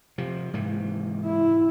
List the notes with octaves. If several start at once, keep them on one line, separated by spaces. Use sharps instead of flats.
C3 F3
G#2 C3 E3
E4